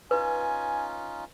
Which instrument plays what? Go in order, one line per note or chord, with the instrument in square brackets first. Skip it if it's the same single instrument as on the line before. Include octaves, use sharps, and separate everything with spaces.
[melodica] C#4 D#4 F4 [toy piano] B4 [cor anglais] G#5